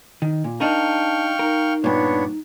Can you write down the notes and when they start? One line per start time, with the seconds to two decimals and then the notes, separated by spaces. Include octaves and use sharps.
0.22 D#3
0.44 A#2
0.60 D4 D#4 A#4 F5 G5 A5 C#6
1.39 D#4 A#4
1.84 G2 A#2 B3 D4 C#5